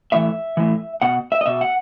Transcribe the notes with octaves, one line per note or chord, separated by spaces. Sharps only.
A2 E3 E5
A2 E3
B2 F#5
E5
D#5
B2 E5
F#5